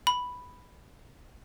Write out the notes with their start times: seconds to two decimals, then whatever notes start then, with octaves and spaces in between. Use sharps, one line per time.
0.07 B5